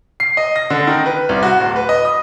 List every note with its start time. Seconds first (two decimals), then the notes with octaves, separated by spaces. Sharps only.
0.20 C7
0.37 D#5
0.56 A#6
0.70 D3
0.87 D#3
1.06 B4
1.29 C2
1.43 F#4
1.61 D1
1.76 B4
1.89 D#5
2.05 D#6